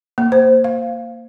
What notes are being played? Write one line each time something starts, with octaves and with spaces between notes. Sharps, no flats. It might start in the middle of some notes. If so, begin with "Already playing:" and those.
A#3
C5
F5